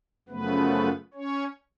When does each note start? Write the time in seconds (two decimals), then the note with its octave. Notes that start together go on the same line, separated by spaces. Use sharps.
0.28 F#2 C#3 F3 A3 B3 B4
1.14 C#4 C#5